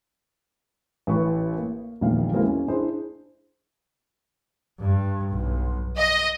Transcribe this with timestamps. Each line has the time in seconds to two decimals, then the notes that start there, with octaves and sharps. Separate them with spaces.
1.07 A1 A2 B4 C#6
1.58 A#3
2.01 E1 A#1 A#2 D#3 F5
2.32 F#3 G#3 A#3 C4 E4 A#4
2.45 C#4
2.68 D4 E4 G#4 C5
4.83 G2
5.32 B1
5.97 D#5